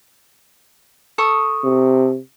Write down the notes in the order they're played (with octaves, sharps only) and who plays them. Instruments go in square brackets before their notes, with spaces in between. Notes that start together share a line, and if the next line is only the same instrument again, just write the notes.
[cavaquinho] A4 C#6 D#6
[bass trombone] C3